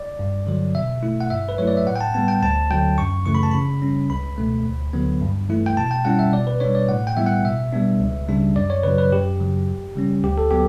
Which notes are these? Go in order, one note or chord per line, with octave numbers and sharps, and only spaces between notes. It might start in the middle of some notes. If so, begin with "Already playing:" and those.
Already playing: D5
G2
D3 F#3
B2 E5
A3 E4
F#5
G2 E5
B4
F#3 A3 E4 C#5
D5
E5
A2 F#5
G5
A5
G3 B3 A5
G5
D2 A5
D3 F#3 G5
F#2 C#6
C#3 E3 A3 C#6
B5
A5
C#3 B5
G3 C#4
C#2 B5
B2 A3
D2
D3 F#3 B3
G2
E3 A3 E4
G5
B2 A5
G5
G3 C#4 E4 F#5
E5
B2 D5
B4
G3 D4 C#5
D5
A2 F#5
G5
E3 G3 B3 E4 E5
F#5
B2 E5
G3 B3 D4
C#2
C#3 G3 D4
F#2 D5
C#5
C#3 F#3 B4
B4
F#2 G4
C#3 F#3
E2
C#3 G3 C#4
D2 G4
A4
F#3 B3 G4